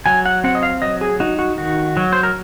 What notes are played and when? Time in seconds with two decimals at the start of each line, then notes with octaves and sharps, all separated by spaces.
0.06 F#3 G#5
0.26 F#5
0.44 C4 F#5
0.55 D#5
0.63 F5
0.82 F#3 D#5
1.01 G#4
1.20 D#4 F#4
1.39 F#4
1.58 D#3 F#4
1.97 F#3
2.13 C5
2.23 A#4